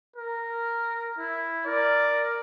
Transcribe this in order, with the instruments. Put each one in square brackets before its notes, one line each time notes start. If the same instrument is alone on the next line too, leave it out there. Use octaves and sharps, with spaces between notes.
[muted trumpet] A#4
E4
[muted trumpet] A#4 [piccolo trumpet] D5